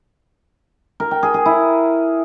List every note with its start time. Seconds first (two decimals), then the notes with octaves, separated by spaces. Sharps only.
1.00 A#4
1.11 G5
1.23 G#4
1.34 G#4
1.46 E4